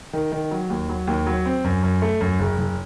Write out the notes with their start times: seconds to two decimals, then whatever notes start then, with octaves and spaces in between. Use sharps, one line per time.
0.13 D#3
0.32 D#3
0.51 F#3
0.70 D#2
0.89 F#3
1.07 D#2
1.27 F#3
1.46 C4
1.64 F#2
1.83 F#2
2.02 A3
2.21 F#2
2.39 F#1
2.58 F#1